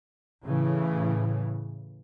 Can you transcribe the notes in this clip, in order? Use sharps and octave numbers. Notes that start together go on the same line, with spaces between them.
A2 C#3 E3